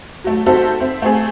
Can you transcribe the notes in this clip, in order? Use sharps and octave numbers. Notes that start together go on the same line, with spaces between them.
F#3 A3
C4 D#4 F#4 A4 C5 E5
C4 E5
A3 C4 G#4